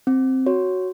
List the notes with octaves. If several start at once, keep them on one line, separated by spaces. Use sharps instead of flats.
C4
F#4 C#5